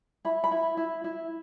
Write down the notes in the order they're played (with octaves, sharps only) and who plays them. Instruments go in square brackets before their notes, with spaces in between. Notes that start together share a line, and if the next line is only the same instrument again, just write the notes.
[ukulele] E4 B5
B5
E4
E4
E4